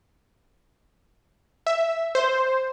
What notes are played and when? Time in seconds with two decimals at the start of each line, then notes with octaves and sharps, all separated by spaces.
1.66 E5
2.15 C5